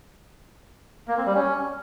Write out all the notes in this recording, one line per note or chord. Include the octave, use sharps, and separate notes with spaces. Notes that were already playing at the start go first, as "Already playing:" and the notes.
A#3
C4
G3
C#4